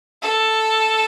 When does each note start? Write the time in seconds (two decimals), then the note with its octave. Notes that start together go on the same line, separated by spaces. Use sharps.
0.22 A4